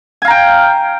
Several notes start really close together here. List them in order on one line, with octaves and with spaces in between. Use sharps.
G#5 F5 A#5 G5